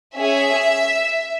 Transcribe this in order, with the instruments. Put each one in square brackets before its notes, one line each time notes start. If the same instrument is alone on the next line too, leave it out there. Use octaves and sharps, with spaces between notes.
[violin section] C#4 G#4 E5